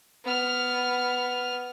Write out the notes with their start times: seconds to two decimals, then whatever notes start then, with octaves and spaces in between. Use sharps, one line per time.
0.24 B3 F6